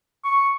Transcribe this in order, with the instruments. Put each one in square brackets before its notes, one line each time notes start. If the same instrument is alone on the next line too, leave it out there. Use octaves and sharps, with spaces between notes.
[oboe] C#6